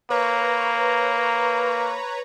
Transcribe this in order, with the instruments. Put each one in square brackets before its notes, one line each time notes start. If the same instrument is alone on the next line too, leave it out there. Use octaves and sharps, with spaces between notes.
[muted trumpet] A#3 [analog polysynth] B4 C#5 A#5